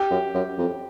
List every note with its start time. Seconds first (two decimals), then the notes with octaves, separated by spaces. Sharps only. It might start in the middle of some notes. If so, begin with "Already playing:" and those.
Already playing: G4
0.11 F#2
0.34 F#2
0.58 F2